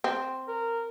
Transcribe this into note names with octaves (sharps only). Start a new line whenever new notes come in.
C4
A#4